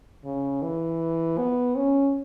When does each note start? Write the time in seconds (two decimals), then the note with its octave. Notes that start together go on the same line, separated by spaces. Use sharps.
0.25 C#3
0.62 E3
1.38 B3
1.77 C#4